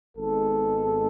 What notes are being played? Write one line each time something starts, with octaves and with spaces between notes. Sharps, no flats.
G#1 G#2 G#3 B3 A4